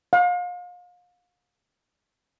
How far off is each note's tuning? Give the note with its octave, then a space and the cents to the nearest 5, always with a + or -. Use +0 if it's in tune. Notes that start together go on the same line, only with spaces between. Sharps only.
F5 +35